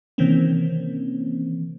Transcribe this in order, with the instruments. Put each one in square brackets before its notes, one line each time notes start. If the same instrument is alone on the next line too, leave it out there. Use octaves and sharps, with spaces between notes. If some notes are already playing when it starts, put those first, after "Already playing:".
[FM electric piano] C3 D#3 E3 A#3 C4 C#4